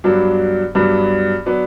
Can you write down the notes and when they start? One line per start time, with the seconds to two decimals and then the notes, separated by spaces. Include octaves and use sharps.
0.04 G2 F#3 B3 D4
0.75 G2 F#3 B3 D4
1.46 F#3 B3 D4